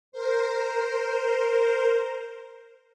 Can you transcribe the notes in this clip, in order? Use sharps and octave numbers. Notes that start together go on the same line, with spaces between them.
A#4 C5